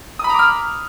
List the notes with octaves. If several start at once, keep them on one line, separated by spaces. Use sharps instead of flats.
A#5 B5 D6 D#6 F6